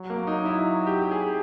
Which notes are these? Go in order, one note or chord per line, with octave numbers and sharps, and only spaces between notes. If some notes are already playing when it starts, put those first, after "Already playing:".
Already playing: F#3
A#3
D#4
E4
G4
G#4